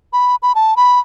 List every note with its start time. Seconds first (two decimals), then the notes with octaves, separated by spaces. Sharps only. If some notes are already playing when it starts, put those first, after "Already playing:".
0.13 B5
0.42 B5
0.55 A5
0.77 B5